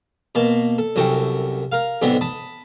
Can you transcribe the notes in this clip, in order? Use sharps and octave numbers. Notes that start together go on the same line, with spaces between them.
B2 A#3 A5
A4
C2 F#2 F#4 A4 G5
A#4 F5
B1 G#2 D3 B3 C4
A5 B5 D#6